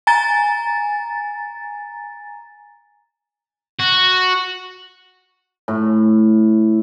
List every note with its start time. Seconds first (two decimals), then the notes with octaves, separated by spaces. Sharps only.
0.07 G#5 A#5 A6
3.80 F#4
5.68 A2